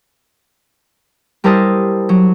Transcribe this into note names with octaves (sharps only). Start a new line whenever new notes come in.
G3 E4 A#4 C5 A5 D#6
F#3